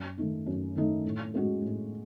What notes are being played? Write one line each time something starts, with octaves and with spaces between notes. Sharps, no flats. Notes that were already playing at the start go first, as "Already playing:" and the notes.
Already playing: F#2
D#3 A3 D#4
F#2
D#3 A3 D#4
A2
G#3 C#4 F#4
A2